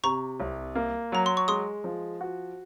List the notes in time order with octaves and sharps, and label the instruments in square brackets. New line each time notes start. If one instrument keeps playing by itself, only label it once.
[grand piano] C3 [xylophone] A#5 C#6
[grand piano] C2
A#3
[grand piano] F#3 [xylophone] A#5
[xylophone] C6
C#6
[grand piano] G#3 [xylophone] C6 D#6
[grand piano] F3
F#4